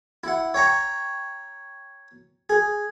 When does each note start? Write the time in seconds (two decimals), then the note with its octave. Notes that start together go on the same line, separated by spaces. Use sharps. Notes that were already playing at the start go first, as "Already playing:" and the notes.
0.24 E4 F#5
0.54 C#5 G5 A#5 C#6
2.50 G#4